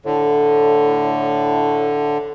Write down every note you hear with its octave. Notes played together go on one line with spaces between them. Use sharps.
A2 D3